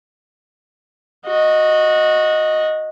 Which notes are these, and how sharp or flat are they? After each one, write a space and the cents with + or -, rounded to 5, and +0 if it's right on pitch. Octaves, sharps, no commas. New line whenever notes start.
F#4 -20 D#5 +0